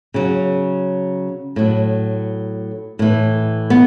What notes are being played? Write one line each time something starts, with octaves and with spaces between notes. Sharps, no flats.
C#3 F#3
A2 F#3
A2 E3
B3